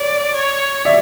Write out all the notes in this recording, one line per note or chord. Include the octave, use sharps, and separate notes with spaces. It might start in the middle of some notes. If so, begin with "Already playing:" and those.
Already playing: C#5 D5
C#5
D5 E5